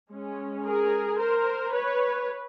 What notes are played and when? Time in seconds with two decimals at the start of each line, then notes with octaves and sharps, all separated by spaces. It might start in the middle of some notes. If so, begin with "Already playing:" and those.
0.11 G#3 C#4
0.65 G#4 A#4
1.19 A#4 C5
1.73 B4 C#5